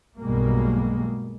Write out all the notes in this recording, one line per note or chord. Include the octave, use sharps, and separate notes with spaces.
B1 G2 B2 G3 G#3 A#3